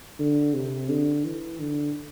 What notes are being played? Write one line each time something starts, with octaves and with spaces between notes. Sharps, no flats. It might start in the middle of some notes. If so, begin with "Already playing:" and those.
D3
C3
D3
E3
D3